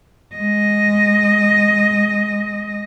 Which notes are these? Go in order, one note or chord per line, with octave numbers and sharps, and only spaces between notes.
G#3 D#5